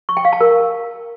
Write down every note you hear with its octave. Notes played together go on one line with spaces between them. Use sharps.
C#6
G5
F5
A5
A#4